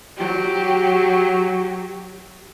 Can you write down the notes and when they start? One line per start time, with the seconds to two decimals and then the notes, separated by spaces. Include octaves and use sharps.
0.16 F#3 G4